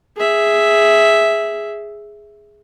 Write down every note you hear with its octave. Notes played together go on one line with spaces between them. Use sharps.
G#4 E5